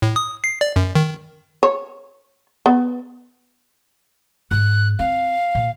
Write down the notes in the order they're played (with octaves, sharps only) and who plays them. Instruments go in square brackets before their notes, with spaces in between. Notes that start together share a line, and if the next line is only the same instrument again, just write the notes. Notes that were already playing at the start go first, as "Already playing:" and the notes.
[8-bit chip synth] A2
D#6
C7
D5
F#2
D#3
[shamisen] C#5
B3
[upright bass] G#2 [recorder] F#6
[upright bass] C4 [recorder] F5
[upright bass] A#2